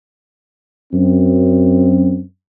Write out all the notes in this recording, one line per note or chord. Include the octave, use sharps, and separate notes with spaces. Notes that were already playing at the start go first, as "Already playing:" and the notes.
F#2 C4